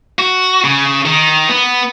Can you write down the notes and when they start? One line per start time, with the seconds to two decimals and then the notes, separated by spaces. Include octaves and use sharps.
0.19 F#4
0.64 C#3
1.06 D#3
1.48 B3